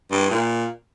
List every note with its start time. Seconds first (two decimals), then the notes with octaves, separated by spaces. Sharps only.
0.11 G2
0.31 A#2